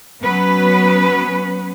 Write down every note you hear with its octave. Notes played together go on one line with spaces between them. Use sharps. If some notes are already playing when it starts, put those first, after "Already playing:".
F#3 B3 C#4 B4